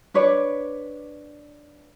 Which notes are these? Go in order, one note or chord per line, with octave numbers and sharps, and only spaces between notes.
D4 B4 C#5 D5